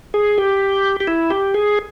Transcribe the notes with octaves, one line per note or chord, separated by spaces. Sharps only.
G#4
G4
G4
E4
G4
G#4